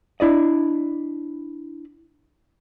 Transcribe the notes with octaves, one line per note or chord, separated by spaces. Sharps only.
D4 E4 D5 D#5